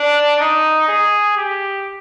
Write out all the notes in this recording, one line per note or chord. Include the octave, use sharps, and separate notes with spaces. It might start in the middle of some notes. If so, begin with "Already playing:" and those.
Already playing: D4
D#4
G#4
G4